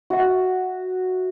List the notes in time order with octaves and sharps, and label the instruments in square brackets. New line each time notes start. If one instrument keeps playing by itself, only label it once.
[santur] F#4 E5